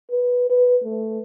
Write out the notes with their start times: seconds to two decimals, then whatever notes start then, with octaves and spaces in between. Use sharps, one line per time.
0.11 B4
0.50 B4
0.84 A3